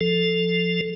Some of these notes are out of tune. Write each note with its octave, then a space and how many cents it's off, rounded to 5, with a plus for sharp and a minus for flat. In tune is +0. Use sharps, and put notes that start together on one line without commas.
F3 +0 A4 +0